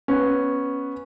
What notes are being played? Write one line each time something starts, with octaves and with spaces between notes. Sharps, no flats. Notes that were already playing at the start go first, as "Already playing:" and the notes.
B3 C#4